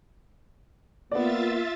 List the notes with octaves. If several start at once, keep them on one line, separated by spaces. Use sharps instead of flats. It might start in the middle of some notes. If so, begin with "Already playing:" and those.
A#3 B3 F4 D5 E5 A6